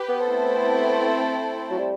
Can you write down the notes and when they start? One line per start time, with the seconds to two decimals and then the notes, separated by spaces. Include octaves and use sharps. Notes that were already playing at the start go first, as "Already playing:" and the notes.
Already playing: G4 B4
0.09 B3
0.28 A3 C4 E4 A4 C5
1.71 F#3
1.78 G3